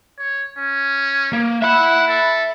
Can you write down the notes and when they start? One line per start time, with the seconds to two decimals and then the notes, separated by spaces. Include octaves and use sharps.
0.19 C#5
0.59 C#4
1.33 A#3
1.62 E5 F#5 B5
2.08 A4